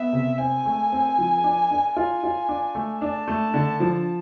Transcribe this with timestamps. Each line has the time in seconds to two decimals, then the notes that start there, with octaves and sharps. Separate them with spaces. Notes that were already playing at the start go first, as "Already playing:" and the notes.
Already playing: B3 E5
0.13 C3
0.39 C4 G#5
0.66 A3
0.92 C4
1.18 F3
1.44 D4
1.71 D4
1.97 F4 G#5
2.24 F4
2.49 D4
2.75 A3
3.01 D4 A5
3.28 A3
3.54 D3
3.80 F3